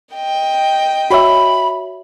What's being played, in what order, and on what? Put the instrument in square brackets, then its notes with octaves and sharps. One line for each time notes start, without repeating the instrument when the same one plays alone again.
[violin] D#5 G5
[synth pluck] F#4 C#5 E5 [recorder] B5